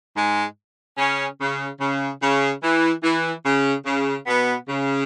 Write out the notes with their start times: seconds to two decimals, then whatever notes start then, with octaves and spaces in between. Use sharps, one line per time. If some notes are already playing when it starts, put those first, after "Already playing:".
0.16 G#2 G#3
0.98 C#3 C#4
1.40 C#3
1.81 C#3
2.21 C#3
2.63 E3
3.03 E3
3.45 C#3
3.86 C#3
4.27 B2 B3
4.67 C#3